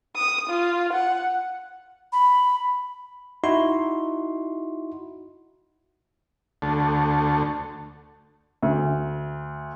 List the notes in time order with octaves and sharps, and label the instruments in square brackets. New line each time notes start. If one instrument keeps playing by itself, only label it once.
[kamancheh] D#6
F4
F#5
[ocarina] B5
[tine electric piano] D#4 E4 F#4 C6
[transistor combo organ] D2 A3
[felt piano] D2